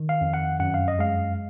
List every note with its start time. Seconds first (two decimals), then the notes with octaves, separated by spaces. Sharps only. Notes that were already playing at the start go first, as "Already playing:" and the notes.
Already playing: D#3
0.09 F5
0.21 F2
0.34 F#5
0.60 F#2 F#5
0.74 F5
0.88 D#5
0.99 G#3 F5